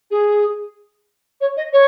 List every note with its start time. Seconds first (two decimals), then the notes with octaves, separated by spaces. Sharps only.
0.11 G#4
1.41 C#5
1.57 D#5
1.73 C#5